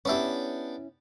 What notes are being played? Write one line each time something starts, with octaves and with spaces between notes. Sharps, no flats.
B3 C#4 D4 E4 G4 C#5 E5